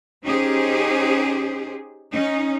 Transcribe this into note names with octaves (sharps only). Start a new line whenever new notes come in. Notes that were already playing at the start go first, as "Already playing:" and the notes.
C#4 D#4 G4 G#4 C5
C#4 D#4